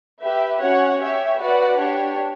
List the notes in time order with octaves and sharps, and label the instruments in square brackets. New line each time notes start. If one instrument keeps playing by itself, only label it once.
[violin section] G4 B4 E5
C#4 F#4 C#5 F#5
G4 C#5 E5
F#4 B4 D5 F#5
D4 G4 C#5